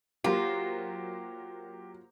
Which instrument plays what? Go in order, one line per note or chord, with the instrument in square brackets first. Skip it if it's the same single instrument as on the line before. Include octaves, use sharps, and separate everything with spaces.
[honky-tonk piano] F#3 A#3 C5 [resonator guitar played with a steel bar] F4 [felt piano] G4